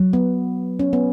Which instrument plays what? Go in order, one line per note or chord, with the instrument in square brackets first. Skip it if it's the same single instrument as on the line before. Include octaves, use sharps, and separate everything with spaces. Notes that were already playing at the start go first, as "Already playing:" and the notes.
Already playing: [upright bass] F#3
[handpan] B3
C#4
B3